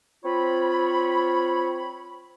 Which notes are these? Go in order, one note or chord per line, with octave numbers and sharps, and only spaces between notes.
C4 F4 C#5 B5